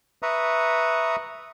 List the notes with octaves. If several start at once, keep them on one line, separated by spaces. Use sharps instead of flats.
B4 E5 A#5 C#6 D#6